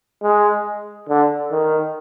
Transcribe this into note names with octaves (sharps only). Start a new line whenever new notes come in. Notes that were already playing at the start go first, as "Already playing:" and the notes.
G#3
D3
D#3